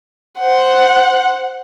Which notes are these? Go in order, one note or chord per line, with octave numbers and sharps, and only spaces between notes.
C5 F#5